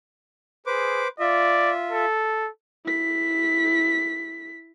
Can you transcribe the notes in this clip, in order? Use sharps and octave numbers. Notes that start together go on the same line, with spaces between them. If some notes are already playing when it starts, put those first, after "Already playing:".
G#4 B4 C5 D6
F4 D5 E5
A4
E4 B6